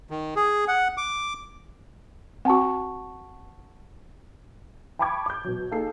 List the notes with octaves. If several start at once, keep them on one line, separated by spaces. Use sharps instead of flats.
D#3
G#4
F#5
D6
C4 F#4 F#5 A5 C#6
G5 A5 B5 C#6 D6 G#6
D6 G6
B2 F#3
A#3 D#4 G#4 A4 C7